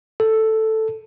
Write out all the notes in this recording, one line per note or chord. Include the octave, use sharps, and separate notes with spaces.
A4